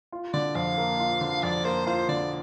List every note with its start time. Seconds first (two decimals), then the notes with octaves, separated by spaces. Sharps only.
0.12 F4
0.33 D3 D5
0.55 F2 F5
0.78 A#3
1.00 F4
1.21 D3
1.43 F2 D5
1.64 A#3 C5
1.87 F4 C5
2.09 D3 D5